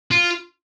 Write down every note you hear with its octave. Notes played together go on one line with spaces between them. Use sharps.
F4